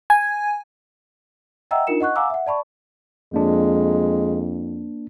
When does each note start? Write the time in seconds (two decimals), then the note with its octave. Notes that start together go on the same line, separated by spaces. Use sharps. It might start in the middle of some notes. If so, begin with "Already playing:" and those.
0.10 G#5
1.71 D#5 E5 F#5 G5 A#5 E6
1.87 D4 D#4 F4 A#4 C#7 E7
2.00 D#5 F#5 C#6 F#6
2.16 F5 F#5 G#5 A#5 D6 E6
2.30 E5 F#5
2.46 D5 A5 B5 C#6
3.34 F2 G#3 A#3 D4